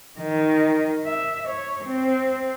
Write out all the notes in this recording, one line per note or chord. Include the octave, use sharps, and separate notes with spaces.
D#3
E5
C#5
C4